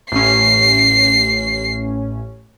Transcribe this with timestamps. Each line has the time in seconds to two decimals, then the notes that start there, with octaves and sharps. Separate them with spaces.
0.12 A1 C#4 C7